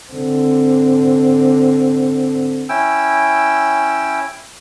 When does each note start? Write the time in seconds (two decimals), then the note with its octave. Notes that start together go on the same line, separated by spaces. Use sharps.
0.12 D3 C4
2.69 C#4 E4 G5 E6